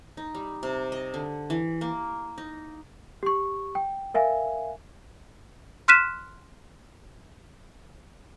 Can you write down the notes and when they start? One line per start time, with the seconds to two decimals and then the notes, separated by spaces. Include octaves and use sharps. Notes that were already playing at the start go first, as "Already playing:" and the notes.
0.17 D#4
0.35 G3
0.63 C3
0.92 D#5
1.14 D3
1.50 E3
1.81 A#3
2.38 D#4
3.23 G4 C#6
3.75 G5
4.14 A#4 E5 F5 G#5
5.88 C6 F6 F#6 B6 D#7 E7